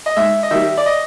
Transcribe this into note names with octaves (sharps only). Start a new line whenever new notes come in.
D#5
G#2 E5
D#5
D#3 G3 E5
D5
D#5